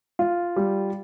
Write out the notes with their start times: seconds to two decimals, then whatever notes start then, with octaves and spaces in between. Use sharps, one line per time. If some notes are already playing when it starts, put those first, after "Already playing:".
0.19 F4
0.56 G3